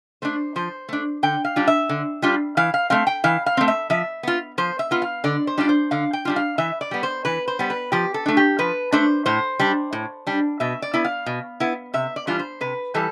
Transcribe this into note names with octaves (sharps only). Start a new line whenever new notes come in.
A3 D4 C5
F3 C5
A3 D4
D3 G5
F5
G3 D4 F4
E5
D3
G3 D4 F4
E3 F5
F5
A3 C4 F5
G5
E3 F5
F5
A3 C4
E5
F3 E5
B3 F4
F3 C5
E5
B3 F4
F5
D3 D5
C5
G3 D4 F4 D5
C5
D3 F5
G5
G3 D4 F4
F5
E3 E5
D5
G3 B3
C5
E3 B4
C5
G3 B3
B4
F3 G4
A4
A3 D4
G4
F3 B4
A3 D4 C5
A2 C5
G3 D4
A2
G3 D4
B2 E5
D5
B3 E4
F5
B2
B3 E4
C3 E5
D5
E3 G3 D4 F4
C5
C3 B4
E3 G3 A4